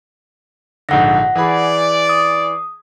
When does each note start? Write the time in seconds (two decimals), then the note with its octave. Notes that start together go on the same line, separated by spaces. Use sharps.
0.89 A#1 G#2 D3 F#5 A#6
1.36 E3 G#4 D5 B5
2.09 D#6